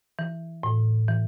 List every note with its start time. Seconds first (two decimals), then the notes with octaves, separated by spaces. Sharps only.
0.19 E3
0.63 A2
1.08 E3